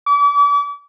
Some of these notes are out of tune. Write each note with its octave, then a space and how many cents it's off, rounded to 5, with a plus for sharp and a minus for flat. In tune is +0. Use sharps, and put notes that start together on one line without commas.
D6 -40